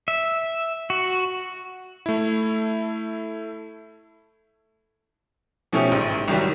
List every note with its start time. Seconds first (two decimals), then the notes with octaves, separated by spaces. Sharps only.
0.08 E5
0.90 F#4
2.06 A3 E4
5.73 B2 F3 A3 C#4 G4
5.92 A1 G#2
6.28 C2 D#3 F#3 G3